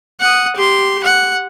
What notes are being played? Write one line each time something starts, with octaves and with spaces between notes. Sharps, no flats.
F#5 D#6
G4 C6
F#5